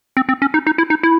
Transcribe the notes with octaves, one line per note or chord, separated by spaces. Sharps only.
C4
C4
C#4
D#4
D#4
E4
D#4
E4